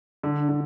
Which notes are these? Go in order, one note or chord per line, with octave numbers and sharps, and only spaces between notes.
D3 D4
D3